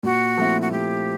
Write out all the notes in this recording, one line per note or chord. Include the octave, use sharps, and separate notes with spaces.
A#2 F#4
F3 A3 C4 E4
F#4
A#2 G4